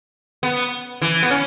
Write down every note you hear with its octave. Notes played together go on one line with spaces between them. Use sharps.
B3
E3
B3
C#4